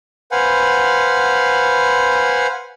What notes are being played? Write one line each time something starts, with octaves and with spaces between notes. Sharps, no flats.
B4 C5 F5 F#5 G#5